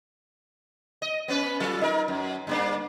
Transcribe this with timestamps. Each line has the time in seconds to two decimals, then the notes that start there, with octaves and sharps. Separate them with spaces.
1.02 D#5
1.28 B3 C#4 B4
1.60 F#3 F4 A4
1.81 D#4 A#4
2.08 F#2
2.47 G2 A#3 D4